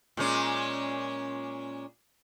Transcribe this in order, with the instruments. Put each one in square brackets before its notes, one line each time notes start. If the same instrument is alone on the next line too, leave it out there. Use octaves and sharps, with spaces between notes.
[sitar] A#2 G#3 C#4